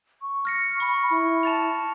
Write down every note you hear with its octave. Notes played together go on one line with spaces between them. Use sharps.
C#6
F6 A#6 C#7
B5 C#6
E4
A5 A6 F7